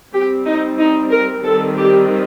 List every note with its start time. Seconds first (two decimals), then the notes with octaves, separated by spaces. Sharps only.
0.14 G3 C4 G4
0.46 D#4
0.78 D#4
1.11 A#4
1.44 D#3 G3 C4 A4
1.76 G4